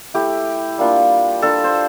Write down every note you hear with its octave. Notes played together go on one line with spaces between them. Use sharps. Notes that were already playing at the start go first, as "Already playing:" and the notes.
A3 E4 G4
G3 A#3 D4 F4
G3 D4 F4 A4
C5